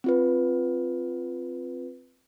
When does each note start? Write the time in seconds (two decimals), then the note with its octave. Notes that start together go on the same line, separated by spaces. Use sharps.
0.04 C4 F4 B4